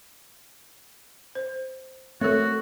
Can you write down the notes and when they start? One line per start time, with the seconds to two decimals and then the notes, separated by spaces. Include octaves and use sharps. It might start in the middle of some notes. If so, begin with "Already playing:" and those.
1.35 C5
2.21 A3 C4 F#4 A4 A#4 C#5